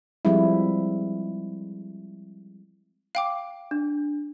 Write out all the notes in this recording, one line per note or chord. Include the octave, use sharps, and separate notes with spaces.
F3 G3 G#3 C4 E4
F5 G5 D6
D4